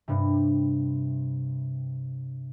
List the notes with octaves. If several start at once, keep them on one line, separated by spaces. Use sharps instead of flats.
G2 C3